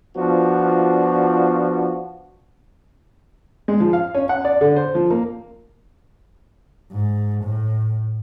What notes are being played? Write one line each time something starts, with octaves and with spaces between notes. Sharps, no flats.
F3 B3 D4 F4 F#4
G#3
F3
F5
C#4
F#5
D5
D3
C5
F3
A#3
G#2
A2